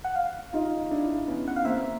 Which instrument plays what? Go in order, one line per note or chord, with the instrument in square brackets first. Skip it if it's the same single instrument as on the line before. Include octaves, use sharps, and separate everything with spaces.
[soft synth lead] F#5
F5
[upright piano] D#4 F4
D4 E4
B3 C#4
[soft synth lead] F#5
F5
[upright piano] A#3 C4 [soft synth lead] E5